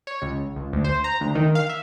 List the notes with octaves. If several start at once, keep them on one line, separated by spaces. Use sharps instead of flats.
C#5
C#2
C#2
D2
C5
A#5
D2
D#3
F5
E5